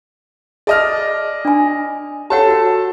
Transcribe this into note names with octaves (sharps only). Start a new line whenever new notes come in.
G#4 D5 D#5 A5 F6
D4 G#5
G4 A4 C#5 F#5 A5
F#4 F#5